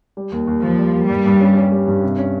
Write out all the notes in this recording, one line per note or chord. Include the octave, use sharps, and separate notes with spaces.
G3
D#2
D#2
D#2 F3
G3
D#2
G2 G3
G2
C#4
C#4
G3
G2
C3
C#4